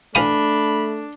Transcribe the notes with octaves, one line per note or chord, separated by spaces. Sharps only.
E3 A3 D4 F5 B5 D#6